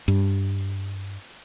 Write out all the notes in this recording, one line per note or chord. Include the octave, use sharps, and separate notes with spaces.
G2